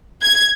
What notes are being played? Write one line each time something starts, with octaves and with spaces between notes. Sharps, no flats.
G#6